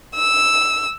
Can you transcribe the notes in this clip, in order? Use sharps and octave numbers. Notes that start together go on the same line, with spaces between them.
E6